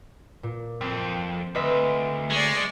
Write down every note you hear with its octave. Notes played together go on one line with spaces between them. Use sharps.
A#2
F2 C4
D2 B4 D#5 E5
G#3 D5 C#6